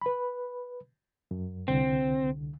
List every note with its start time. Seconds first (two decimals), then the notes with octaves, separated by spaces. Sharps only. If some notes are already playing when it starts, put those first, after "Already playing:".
0.02 B4 B5
1.31 F#2
1.68 C2 D3 C4